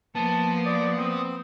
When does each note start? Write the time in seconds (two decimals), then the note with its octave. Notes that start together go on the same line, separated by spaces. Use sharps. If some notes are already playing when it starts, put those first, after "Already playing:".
0.15 F3 A#3 B3 A5
0.66 D5 D#6
0.98 C4 D#6